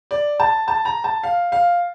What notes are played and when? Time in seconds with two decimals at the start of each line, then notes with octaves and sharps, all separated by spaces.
0.11 D5
0.40 A5
0.68 A5
0.85 A#5
1.04 A5
1.23 F5
1.52 F5